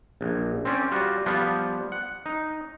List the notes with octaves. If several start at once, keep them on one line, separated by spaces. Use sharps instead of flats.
A#1
C4 C#4 C5 D5
G3 F4 F#4
F3 G3 B3 F4
F#5
D#4